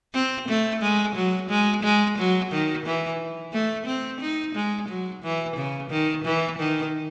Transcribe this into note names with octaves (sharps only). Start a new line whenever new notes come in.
C4
A3
G#3
F#3
G#3
G#3
F#3
D#3
E3
A3
C4
D#4
G#3
F#3
E3
C#3
D#3
E3
D#3